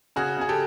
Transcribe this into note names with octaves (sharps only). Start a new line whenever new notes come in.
C#3 F#4 G#4
C#3 G#4
G4 A4